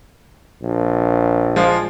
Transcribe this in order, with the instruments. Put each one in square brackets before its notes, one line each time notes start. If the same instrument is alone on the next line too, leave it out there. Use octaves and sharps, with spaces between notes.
[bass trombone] A#1
[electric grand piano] F3 G#3 F4